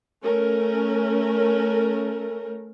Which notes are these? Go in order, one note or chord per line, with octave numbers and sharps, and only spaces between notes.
A3 C#4 A#4